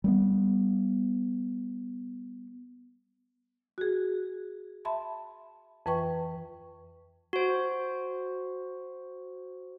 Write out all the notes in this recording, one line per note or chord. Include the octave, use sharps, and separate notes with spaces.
G3 A3 B3
F#4 G#4
E5 A5 B5 C6
F2 E3 B4 G5 C#6
F#4 C5